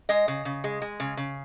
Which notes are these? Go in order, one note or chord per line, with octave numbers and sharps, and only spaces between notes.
G#3 D#5
C#3
C#3
G#3
G#3
C#3
C#3